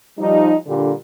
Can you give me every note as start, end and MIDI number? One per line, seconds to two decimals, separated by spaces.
0.19 0.55 53
0.19 0.55 55
0.19 0.55 63
0.66 0.91 46
0.66 0.91 50
0.66 0.91 55